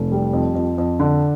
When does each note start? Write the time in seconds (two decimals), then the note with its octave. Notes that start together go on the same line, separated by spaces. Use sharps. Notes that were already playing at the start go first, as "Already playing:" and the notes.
Already playing: F1
0.12 G3
0.33 F2
0.55 F2
0.78 F2
1.00 D3